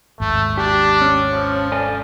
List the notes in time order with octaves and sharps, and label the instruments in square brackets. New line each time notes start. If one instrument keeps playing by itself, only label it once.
[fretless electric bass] G#1 D#2 G#2 [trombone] A3
[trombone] D4 [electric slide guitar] G4
[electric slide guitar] C#4
[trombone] F3
[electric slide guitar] A4 D5 G#5